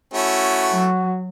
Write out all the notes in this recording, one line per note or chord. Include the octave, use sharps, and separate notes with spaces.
A3 C#4 E4 F#4
F#3